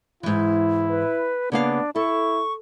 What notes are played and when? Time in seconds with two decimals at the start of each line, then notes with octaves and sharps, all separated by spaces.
0.23 G#2 E3 E4
0.89 B4
1.52 C#3 A#3 B3 D4 F5
1.96 E4 A4 C#6